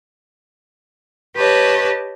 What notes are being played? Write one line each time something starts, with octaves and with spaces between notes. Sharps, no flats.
G4 B4 C#5 D#5 A5